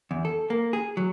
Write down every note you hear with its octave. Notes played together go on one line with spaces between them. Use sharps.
E2
A4
A#3
G#4
F#3